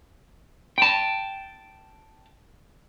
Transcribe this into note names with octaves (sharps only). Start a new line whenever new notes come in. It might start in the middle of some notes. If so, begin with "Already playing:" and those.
G5 A5